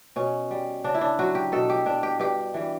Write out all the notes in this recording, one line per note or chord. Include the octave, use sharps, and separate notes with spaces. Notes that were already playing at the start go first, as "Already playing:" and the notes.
B2 C#4
G3
C#3 D4
E4
D4
F#3 F#4
G4
B2 A4
G4
G3 D4
G4
G2 G4
E3 G3